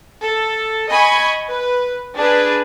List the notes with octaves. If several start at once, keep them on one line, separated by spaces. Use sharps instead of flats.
A4
D#5 G#5 B5 C#6
B4
D4 G#4 B4